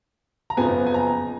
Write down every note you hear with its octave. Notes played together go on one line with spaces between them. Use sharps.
A#5
F#1 F2 F3 B3 G#5
G#5
A#5